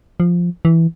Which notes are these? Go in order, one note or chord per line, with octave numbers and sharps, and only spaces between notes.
F3
E3